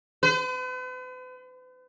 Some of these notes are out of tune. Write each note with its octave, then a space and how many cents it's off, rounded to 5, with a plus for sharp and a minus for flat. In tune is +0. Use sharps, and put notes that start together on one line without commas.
B4 +45